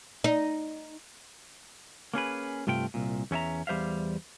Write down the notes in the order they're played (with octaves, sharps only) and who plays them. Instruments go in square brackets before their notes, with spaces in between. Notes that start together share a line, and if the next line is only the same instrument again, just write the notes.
[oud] D#4
[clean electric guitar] A#3 C#4 G#4 B4
G2 C3 A3 F4 G5
C2 A#2
E2 C#4 D#4 E5 A#5
E2 G3 C5 E5 F5